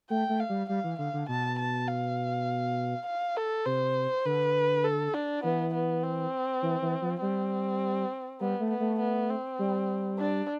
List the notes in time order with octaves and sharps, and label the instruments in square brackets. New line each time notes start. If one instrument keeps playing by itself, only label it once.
[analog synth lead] A3 [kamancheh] G5
[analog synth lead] A3
[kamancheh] F5
[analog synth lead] G3
[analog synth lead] G3 [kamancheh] F5
[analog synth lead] E3
[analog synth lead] D3 [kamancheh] F5
[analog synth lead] D3
[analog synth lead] B2 [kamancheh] A5
[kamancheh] A5
F5
F5
A4
[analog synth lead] C3 [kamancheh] C5
[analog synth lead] D3 [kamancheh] B4
[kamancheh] A4
D4
[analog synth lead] E3 [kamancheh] B3
[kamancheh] B3
C4
[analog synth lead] E3
E3
F3
[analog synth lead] G3 [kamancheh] C4
[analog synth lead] G3 [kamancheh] B3
[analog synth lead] A3
[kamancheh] B3
[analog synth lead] A3
[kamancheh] B3
C4
[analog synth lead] G3
[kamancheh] D4